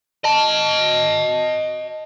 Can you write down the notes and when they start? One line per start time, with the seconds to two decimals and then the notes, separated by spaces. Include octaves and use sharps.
0.24 D#5 A5